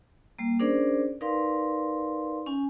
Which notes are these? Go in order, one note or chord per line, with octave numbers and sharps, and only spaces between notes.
G3 A#3
C#4 D4 G#4 A#4 C5 D5
D#4 A#4 B4 D5 F5 C6
C#4 G#5